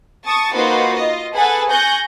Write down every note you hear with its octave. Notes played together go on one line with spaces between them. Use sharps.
A5 C#6 D#6
A#3 D#4 F4 F#4 B4 C5
F4 D#5
G#4 A4 B4 F#5 G#5 A5
G#5 C#6 F#6 G6 A#6